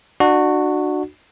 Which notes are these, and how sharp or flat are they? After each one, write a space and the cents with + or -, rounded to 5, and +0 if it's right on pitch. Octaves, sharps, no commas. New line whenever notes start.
D4 +30 F#4 -5